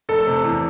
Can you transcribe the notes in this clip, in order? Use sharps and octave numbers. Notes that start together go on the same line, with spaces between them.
F1 A4
C3
E2